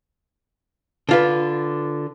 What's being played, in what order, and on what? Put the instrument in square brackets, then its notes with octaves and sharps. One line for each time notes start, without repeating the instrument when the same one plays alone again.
[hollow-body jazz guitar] D3 F4 B4